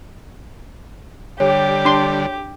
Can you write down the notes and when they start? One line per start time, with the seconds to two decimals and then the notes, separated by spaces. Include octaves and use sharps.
1.40 D3 G3 G4 C#5
1.85 D4 C6